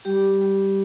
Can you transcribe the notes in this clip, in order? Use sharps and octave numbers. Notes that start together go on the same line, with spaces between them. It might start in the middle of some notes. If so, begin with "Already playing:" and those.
G3 G4
G3